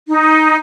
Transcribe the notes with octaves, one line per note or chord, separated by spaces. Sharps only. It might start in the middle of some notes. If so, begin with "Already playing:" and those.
D#4